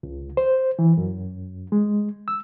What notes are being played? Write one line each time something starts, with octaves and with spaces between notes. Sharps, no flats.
C#2
C5
E3
F#2
G#3
E6